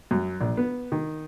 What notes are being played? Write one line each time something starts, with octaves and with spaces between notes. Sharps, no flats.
F#2
A#1
B3
D#3